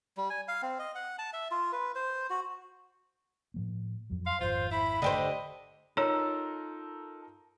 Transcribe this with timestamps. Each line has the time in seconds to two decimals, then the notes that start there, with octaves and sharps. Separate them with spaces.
0.17 G3
0.30 G#5
0.48 F5
0.62 C4
0.79 D#5
0.95 F#5
1.19 A5
1.33 E5
1.51 F4
1.72 B4
1.95 C5
2.30 F#4
3.54 A2 F3 A#3
4.10 F2 F#3
4.26 F5 C6
4.40 G#1 F2 F4 C5
4.71 E4 B5
5.02 D3 G4 C5 D#5
5.97 D#4 F4 A4 A#4 C#5 A#5